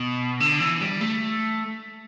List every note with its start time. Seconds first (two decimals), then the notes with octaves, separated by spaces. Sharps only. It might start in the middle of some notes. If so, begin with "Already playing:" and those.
Already playing: B2
0.40 D3
0.60 E3
0.80 G3
1.01 A3